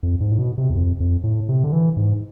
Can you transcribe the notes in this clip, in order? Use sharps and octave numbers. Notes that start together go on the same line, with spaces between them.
F2
G#2
A2
B2
C3
E2
F2
F2
A2
C3
D3
E3
G#2